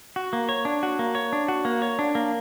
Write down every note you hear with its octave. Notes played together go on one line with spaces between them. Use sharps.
F#4
A#3
C#5
D4
F#4
A#3
C#5
D4
F#4
A#3
C#5
D4
A#3